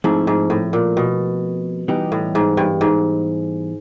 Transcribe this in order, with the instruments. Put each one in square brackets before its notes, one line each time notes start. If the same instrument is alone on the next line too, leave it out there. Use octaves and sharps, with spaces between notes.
[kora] G#2 [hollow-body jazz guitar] F3 A3 C4 E4 A4
[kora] G#2
A2
A#2
B2
[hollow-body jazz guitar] E3 G3 B3 D#4 G4
[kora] A2
G#2
G2
G#2